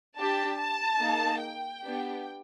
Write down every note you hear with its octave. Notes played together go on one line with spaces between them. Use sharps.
D4 G4 A5
A5
A#3 D#4 G#4
G5
B3 D4 G4